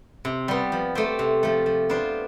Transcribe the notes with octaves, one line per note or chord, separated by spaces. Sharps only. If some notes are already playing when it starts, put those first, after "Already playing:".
C3
G3 B3
F3
A3 C4 G4
C3
F3 A3
F3
B3 D4 F4 C5